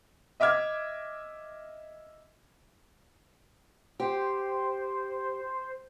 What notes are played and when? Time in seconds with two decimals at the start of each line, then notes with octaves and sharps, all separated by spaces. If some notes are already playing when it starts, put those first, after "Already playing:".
0.40 D#5 E5 D6 F6 G#6
4.00 G4 C5